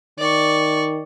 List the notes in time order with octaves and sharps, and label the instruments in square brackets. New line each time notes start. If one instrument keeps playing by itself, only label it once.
[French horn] D#3 [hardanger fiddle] D5 C#6